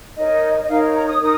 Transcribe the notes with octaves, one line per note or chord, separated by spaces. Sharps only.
D#4 A#4 C#5 D#5
D#5
D#4 A#4 C#5 F5
A#5
D#6
D#4 A#4 D#6